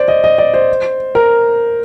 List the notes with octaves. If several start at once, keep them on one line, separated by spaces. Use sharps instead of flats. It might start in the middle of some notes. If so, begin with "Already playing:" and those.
Already playing: C5 D5
D#5
D#5
D5
C5
A#4